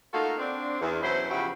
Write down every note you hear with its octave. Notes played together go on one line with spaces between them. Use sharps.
A3 A#3 D#4 F4 F#4 A4
C4 D4
E2
B2 F#3 C#4 E4 C5
C#3 F3 F#3 E4 F#4 G4